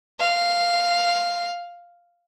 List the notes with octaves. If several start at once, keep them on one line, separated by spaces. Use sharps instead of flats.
F5